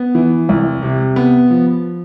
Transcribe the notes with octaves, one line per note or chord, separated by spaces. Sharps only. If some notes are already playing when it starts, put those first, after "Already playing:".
Already playing: B3
E3
C2
C3
B3
F3